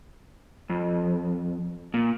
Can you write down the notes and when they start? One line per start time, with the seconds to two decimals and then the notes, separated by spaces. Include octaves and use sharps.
0.70 F2
1.94 A#2